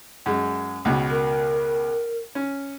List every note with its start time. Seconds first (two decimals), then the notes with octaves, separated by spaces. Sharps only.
0.26 F#2 G#3
0.85 C#2 B2
1.10 A#4
2.35 C#4